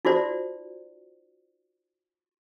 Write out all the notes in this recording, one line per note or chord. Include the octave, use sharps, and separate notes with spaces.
D#4 F4 F#4 C5 D5